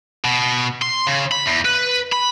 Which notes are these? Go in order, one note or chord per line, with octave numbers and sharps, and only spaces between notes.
B2
C6
C#3
B5
E2
B4
B5